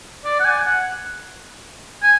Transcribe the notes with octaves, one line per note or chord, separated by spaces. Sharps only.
D5
F#5
G#5
F#5
G#5